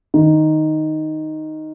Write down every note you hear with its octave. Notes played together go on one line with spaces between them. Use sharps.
D#3